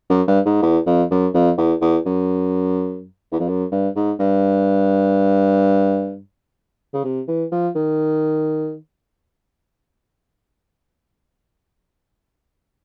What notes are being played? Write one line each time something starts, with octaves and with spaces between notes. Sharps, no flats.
F#2
G2
G#2
E2
F2
F#2
F2
E2
E2
F#2
E2
F2
F#2
G2
G#2
G2
C#3
C3
E3
F3
D#3